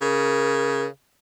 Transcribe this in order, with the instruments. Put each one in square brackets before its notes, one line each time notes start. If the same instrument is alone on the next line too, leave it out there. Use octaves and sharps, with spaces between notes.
[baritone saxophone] C#3 [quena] A#4